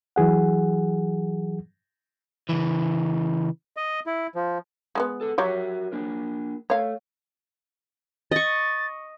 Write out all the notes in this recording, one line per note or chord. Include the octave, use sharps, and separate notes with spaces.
E3 F#3 G#4 F#5
C#3 E3
D#5
E4
F3
G#3 A#3 B3
A4 F#5
F#3 F#4 G4 A#4 C#5 E5
A#3 D4 A#4
A3 C#5 F5
D#5 C#6 A6